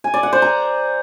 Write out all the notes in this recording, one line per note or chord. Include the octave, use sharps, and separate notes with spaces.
G#5
D5
F#5
C5
A#5